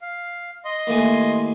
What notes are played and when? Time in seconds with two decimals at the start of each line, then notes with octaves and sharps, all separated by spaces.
0.02 F5
0.65 D#5 C6
0.87 D#2 A2 G#5